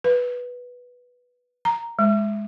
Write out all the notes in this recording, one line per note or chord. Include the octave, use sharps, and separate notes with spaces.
B4
A#5
G#3